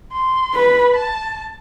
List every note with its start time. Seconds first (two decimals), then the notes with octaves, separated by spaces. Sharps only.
0.13 C6
0.54 B4 B5
0.96 A5